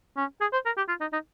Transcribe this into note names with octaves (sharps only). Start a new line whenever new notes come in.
C#4
G#4
C5
A#4
G4
F4
D#4
D#4